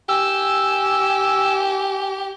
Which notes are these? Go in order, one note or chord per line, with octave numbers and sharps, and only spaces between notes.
G4 G#5 E6